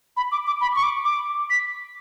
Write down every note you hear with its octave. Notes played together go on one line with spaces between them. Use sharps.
B5
D6
D6
B5
C#6
D6
D6
B6